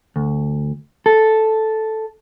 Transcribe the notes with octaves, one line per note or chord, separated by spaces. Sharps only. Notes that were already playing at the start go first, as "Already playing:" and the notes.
D2
A4